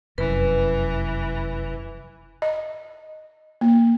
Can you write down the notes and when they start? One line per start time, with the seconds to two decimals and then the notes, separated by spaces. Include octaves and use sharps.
0.18 F1 F#2 E3 B4
2.42 D#5
3.61 A#3